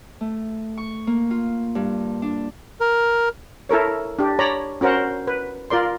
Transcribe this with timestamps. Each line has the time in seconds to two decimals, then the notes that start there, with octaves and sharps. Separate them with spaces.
0.21 A3
0.77 C#6
1.07 A#3
1.31 F4
1.75 G2
2.22 D4
2.80 A#4
3.69 E4 A4 A#4 C#5
4.19 D4 G4
4.39 C#5 D5 A#5 B5
4.81 C#4 F#4 A#4 C5 F#5
5.27 B4
5.70 F4 A#4 D5 C6